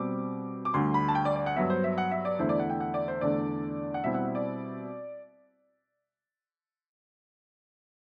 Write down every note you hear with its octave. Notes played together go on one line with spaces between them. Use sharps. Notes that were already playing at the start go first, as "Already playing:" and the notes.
Already playing: B2 G3 C4 D6
D6
D2 D3 G3 C6
B5
A5
G5
D5
D5
F#5
G2 F#3 B3 E5
C5
E5
F#5
E5
D5
E2 D3 A3 E4 C5
D5
F#5
G5
F#5
D5
C5
E2 D3 A3 D4 D5
F#5
B2 G3 C4 E4 E5
F#5
E5
D5